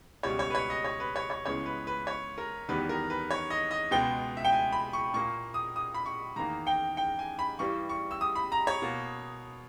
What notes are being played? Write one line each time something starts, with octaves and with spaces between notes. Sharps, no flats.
C#2 B2 G3 C#5
C#5
B4
C#5
D#5
C#5
B4
C#5
C#5
C#2 C#3 E3 G#3 B3 C#5
B4
B4
C#5
A#4
E2 D#3 G3 B3 B4
A#4
B4
C#5
D#5
D#5
C#2 B2 G#3 B3 G5
E5
G5
G#5
B5
C#6
A#2 A#3 C#6
D#6
D#6
B5
C#6
E2 D#3 A#3 A#5
G5
G5
G#5
B5
G2 E3 G3 C#6
C#6
E6
D#6
B5
A#5
C#5
B2 A#3